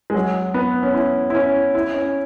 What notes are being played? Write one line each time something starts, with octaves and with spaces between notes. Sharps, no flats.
G#3
F#3
B3
C#4
E4
E4
C#4
E4
C#4